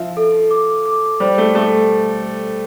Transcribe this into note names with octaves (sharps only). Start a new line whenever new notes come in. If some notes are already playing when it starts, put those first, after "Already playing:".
Already playing: F3 E5
A4
D6
D6
G3 C5
A3
A3 A4